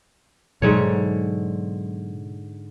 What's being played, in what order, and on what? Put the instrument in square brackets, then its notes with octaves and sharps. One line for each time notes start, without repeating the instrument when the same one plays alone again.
[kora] G#2 D3 C#5 [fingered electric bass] B2 F#3